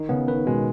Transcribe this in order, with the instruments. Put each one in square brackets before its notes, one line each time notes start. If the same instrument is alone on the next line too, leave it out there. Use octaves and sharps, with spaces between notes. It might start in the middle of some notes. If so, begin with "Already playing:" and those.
Already playing: [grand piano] D#3 [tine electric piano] D#4
[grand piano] C#3 [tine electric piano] B3
[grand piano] D#3 [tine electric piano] B4
[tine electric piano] B2 [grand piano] D#3 G#3